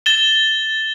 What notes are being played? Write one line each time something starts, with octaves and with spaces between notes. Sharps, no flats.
A6 E7 G7